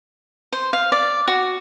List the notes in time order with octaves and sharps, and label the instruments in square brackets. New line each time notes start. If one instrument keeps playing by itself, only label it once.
[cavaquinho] C5
F5
D5
F#4